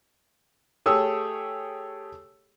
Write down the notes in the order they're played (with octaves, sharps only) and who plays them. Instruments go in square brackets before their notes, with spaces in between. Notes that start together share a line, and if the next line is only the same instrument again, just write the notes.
[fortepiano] A3 G4 G#4 C#5 E6